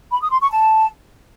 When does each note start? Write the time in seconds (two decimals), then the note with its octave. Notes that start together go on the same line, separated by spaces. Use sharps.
0.12 B5
0.22 D#6
0.31 C6
0.41 C#6
0.51 A5